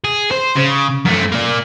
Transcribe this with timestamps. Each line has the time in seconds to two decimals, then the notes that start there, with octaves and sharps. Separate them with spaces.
0.04 G#4
0.31 C5
0.55 C#3
1.05 F#2 A3
1.32 A#3 D5